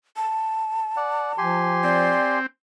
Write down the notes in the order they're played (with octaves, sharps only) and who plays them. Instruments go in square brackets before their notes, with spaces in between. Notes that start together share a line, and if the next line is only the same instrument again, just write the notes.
[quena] A5
[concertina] D5 F#5
[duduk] F3 [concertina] G4 G#5 C6
[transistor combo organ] C4 [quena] D5